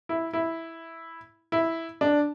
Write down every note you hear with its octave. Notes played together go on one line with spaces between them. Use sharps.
E4
E4
E4
D4